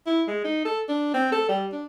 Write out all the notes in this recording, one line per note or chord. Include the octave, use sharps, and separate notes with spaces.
E4
G#3
D#4
A4
D4
C4
A4
G3
D4